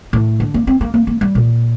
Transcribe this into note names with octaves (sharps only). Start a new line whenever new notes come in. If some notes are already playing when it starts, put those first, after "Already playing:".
A2
D3
A#3
C4
A#3
A#3
A#3
G3
A#2